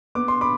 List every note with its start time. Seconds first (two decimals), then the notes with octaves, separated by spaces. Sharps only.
0.15 B3 D6
0.28 C6
0.41 B5 D6